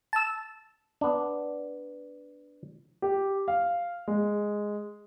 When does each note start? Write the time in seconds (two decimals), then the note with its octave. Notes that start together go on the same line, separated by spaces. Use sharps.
0.13 A5 E6
1.01 B3 D4
3.02 G4
3.48 F5
4.08 G#3